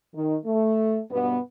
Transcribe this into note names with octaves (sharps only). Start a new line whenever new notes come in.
D#3
A3
G2 B2 B3